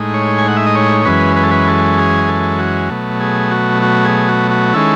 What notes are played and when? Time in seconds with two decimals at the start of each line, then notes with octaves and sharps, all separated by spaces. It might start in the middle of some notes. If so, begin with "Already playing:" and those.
Already playing: A2 G#3 D#4
0.14 C#5
0.38 G#5
0.48 F#5
0.57 E5
0.66 D#5
0.75 C#5
1.05 F#2 E3 G#3 C#4 B4
1.36 B4
1.43 A4
1.51 B4
1.68 A4
1.98 G#4
2.28 A4
2.59 F#4
2.90 B2 F#3 A3
3.20 G#4
3.51 F#4
3.82 F#4
4.05 G#4
4.28 F#4
4.51 F#4
4.74 D#3 G#3 C#4 E4 A4